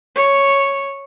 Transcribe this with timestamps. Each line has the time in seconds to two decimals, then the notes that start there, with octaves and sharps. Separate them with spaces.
0.16 C#5